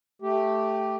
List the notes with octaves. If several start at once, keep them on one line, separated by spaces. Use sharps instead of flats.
A3 G4